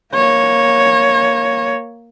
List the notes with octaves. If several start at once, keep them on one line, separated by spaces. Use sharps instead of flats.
A#3 C#5